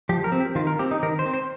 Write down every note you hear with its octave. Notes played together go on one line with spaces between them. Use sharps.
F3 G4
A#4
C4
G4
D#3 F4
A#4
C4 G4
D#4
D#3 A#4
C5
C4
C5